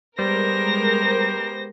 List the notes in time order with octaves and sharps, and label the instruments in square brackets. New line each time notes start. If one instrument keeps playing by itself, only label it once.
[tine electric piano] G3 [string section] G#3 A#4 [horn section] B3 G4 C5 [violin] A#6